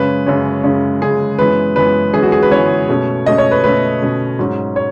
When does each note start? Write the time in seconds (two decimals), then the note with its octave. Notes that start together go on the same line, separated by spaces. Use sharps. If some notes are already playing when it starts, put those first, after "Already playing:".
Already playing: F#2 C#3 G#3 C#4 B4
0.26 F#2 C#3 G#3 C#4
0.64 F#2 C#3 G#3 C#4
1.01 F#2 C#3 G#3 C#4 G#4
1.39 F#2 E3 G#3 B3 B4
1.76 F#2 E3 G#3 B3 B4
2.13 F#2 E3 G#3 B3 G#4
2.23 F#4
2.32 G#4
2.43 B4
2.51 F#2 E3 G#3 B3 C#5
2.89 B2 A3 C#4
3.26 B2 A3 C#4 D#5
3.38 C#5
3.51 B4
3.63 B2 A3 C#4 B4
4.02 B2 A3 C#4
4.39 G#2 F#3 C#4
4.76 C#5